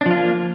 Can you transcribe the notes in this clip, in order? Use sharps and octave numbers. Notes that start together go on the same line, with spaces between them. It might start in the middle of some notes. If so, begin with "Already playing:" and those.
F3 A#3 D4 F4